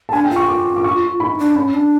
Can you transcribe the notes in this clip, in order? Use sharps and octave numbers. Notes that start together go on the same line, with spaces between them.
A5
D4 G#5
G5
F4
C#6
D6
D6
C#6
D#4 B5
D4
C#4 B5
D4